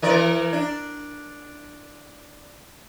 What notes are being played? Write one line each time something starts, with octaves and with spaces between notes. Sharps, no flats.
E3 A#4 D5
D4